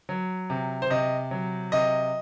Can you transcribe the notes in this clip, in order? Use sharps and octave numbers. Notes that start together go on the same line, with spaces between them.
F#3
C3
C5
C3 D#5
F#3
C3 D#5